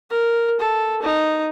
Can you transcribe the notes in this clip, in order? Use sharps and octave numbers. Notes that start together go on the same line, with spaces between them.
A#4
A4
D#4